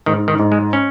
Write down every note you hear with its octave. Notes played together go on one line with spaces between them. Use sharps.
G#2 D#3
D#3
G#2
G#3
C#4